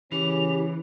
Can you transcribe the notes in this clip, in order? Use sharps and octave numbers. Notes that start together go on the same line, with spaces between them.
C#3 E3 C#4 G4 F7